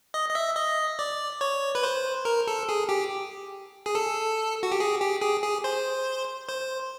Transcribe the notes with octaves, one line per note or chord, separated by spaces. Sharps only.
D#5
D#5
E5
D#5
D5
C#5
B4
C5
A#4
A4
G#4
G4
G#4
A4
F#4
G4
G#4
G4
G#4
G#4
C5
C5